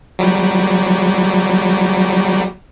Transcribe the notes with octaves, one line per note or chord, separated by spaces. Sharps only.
F#3 G3